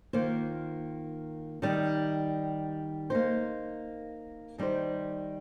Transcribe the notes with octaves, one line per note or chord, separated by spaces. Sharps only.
D#3 A#3 F4 C5
D#3 G3 D#4
A#3 D#4 C5
D#3 G3 D#4 C5